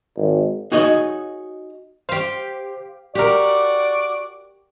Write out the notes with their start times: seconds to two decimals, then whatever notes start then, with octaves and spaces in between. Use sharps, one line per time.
0.17 G#1
0.72 D#4 F#4 G#4 C#5 D#5
2.09 G4 C5 F5
3.15 F#4 G4 A#4 D5 D6